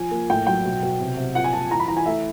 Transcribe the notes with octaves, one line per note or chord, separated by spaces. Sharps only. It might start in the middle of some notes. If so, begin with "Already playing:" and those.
Already playing: F3 G#5
A#3
A2 G5
F#3 G5
B2
B2
C3
C3
A#2 F#5
G#5
A#2 A5
E3 A#5
B5
E3 A#5
G#5
A3 E5